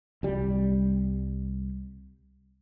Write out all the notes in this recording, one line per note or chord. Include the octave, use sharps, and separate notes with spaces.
C2 G3